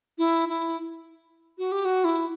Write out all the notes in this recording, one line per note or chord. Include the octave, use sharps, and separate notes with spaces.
E4
E4
F#4
G4
F#4
E4